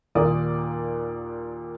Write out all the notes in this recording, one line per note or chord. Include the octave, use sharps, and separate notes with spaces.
D#2 A#2 A#3 D5 D#6